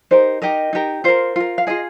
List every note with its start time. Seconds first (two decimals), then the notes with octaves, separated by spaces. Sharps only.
0.11 D#4 G4 A#4 C5
0.42 D#4 G4 A#4 D#5
0.73 D#4 G4 A#4
1.04 F4 A#4 C5
1.36 F4 A#4
1.58 F5
1.67 F4 G#4 D#5